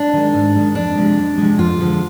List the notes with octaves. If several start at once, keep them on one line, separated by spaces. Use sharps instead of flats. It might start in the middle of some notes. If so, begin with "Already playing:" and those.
Already playing: D4
D#3 G#3
G#2
D#3 G#3
F2 D4
C3 F3 G#3
F2
C3 F3 G#3
F2 F4
D3 F3 G#3